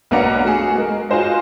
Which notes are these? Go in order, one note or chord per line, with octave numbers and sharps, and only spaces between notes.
B1 A#3 D4 B4 F#5 A#5
A3 F#4 G#4
G#3 A#4
F4 F#4 G#4 C5 D#5